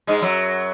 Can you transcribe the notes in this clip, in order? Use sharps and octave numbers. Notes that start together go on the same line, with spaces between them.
G#2 G#3
F#2 F#3